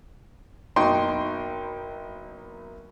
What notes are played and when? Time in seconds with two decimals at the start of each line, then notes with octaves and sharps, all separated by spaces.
0.76 F#1 B2 D#4 G5 C6